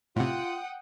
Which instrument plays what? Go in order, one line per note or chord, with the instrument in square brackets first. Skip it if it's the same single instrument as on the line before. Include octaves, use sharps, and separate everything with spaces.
[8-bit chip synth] A2 C3 [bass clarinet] F4 [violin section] F#5 G5 D#6